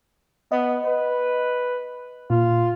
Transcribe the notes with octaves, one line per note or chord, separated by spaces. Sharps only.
B3 D#5
B4
A#2 F4